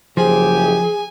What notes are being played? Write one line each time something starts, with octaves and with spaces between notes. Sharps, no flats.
F#1 F3 G4 G#4 G#5